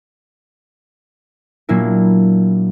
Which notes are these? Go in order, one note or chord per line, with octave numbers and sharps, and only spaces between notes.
A#2 F#3 A#3 D4 E4